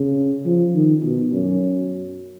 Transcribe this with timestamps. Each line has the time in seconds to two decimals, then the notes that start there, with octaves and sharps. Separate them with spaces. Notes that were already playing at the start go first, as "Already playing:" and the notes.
Already playing: C#3
0.45 F3
0.75 D#3
1.04 B2
1.32 F#2